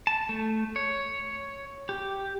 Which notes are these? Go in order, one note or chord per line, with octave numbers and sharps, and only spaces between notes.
A5
A3
C#5
G4